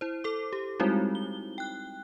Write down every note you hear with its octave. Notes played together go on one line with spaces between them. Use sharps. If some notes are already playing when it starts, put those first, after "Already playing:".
E4 C5
A4 D6
G4
G3 G#3 C4 D#4 E4 F#4
G7
G5 F#6